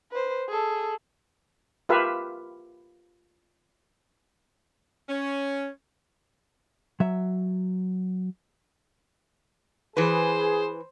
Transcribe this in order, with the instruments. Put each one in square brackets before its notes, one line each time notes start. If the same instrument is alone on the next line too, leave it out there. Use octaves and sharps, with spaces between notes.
[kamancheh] B4 C5
G#4 A4
[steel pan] F4 G4 A#4 B4 E5 F5
[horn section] C#4
[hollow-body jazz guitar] F#3 E5
[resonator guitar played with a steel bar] E3 B4 [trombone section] G#4 [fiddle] C5